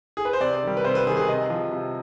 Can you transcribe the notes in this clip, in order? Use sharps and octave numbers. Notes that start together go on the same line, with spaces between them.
G#4
B4
C5
C3 D5
D#3 G3
B4
C3 C5
B4
D#3 G3 G#4
G#4
C3 D#5
F3
C3